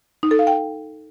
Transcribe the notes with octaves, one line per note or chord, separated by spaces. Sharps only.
D#4
A4
F5
G5